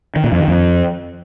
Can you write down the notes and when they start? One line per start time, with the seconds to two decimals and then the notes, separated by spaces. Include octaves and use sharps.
0.16 D#3
0.24 A#2
0.32 F2
0.40 D#3
0.48 F2